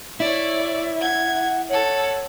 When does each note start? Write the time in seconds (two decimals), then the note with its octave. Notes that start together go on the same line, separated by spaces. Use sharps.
0.20 E4 C#5 D5
1.01 F#5 G#6
1.69 A4 C#5 F#5